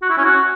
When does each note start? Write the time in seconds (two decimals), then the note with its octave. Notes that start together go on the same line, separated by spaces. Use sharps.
0.03 F#4
0.10 E4
0.18 C#4
0.25 F#4